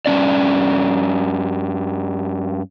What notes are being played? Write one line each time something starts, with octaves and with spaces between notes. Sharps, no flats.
G2 C3 C#4 D5